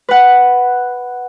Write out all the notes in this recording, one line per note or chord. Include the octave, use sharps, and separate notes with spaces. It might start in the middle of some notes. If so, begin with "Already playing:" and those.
B4 F#5